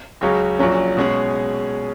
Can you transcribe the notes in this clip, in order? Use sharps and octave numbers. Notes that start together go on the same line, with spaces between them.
C#2 C#3 F#3 C#4
A#1 A#2 F#3 C#4
B2 G#3 C#4 G#4